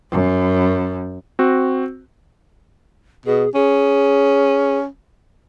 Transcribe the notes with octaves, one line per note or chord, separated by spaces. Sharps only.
F#2
C4 F#4
B2 G#4
C#4 G#4